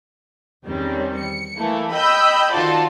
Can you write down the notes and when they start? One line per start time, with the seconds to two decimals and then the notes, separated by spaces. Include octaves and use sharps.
0.66 E2 D#3 G3 C4 C#4
1.18 C#7
1.55 E3 A3 A#3 E4
1.92 D#5 G5 B5 E6 G6
2.52 D#3 F4 F#4 A4 C5 D5